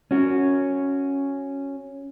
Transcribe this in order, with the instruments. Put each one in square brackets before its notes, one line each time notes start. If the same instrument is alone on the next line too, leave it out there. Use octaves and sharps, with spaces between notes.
[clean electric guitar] C#4 F#4